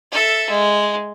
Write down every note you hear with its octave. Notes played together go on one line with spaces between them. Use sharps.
A4 E5
G#3